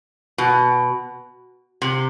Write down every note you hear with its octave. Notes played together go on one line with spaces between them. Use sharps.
B2
C3